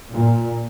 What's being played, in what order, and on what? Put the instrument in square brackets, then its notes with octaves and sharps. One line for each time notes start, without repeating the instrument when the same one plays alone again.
[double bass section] A#2